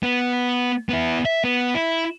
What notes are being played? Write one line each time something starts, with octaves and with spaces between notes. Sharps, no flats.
B3
B3 E4
E5
B3
E4